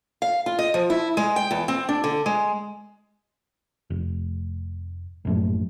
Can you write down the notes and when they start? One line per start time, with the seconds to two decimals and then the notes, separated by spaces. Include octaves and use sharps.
0.22 F5
0.46 F4
0.59 D#5
0.74 F3
0.90 E4
1.17 G#3
1.36 G5
1.51 E2
1.68 C4
1.89 D4
2.04 D3
2.26 G#3
3.90 F1
5.25 A#1 F#2 A2